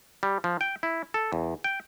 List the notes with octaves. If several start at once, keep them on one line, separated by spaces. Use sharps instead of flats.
G3
F3
G5
E4
A4
E2
G5